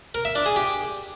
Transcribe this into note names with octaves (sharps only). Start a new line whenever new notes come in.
A#4
E5
D4
G#4
G4